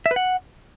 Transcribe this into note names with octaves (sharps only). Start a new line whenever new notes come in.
E5
B4
F#5